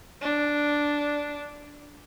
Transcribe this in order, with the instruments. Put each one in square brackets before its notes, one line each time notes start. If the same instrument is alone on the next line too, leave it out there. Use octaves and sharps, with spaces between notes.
[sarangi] D4